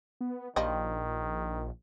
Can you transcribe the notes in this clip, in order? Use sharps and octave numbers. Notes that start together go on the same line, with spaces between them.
B3
A#1 D#3 F3 G3 D#5